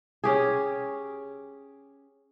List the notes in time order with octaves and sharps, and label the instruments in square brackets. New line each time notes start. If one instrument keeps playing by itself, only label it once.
[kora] C#4 G4 G#4